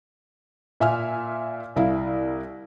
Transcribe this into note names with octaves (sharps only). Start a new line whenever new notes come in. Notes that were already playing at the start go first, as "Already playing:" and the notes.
A#2 E5 G#5 F6
C2 E4 F5